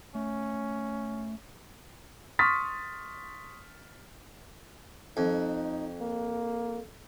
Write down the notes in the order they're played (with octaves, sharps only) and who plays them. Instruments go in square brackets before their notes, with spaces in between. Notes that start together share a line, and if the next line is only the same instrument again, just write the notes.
[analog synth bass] A3 [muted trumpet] C#4
[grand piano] C6 C#6 D#6 F6 A6 B6
[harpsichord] F2 [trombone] D#4
[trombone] A#3